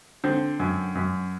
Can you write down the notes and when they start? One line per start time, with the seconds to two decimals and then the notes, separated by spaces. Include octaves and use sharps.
0.24 D3 C4
0.60 F#2
0.95 F#2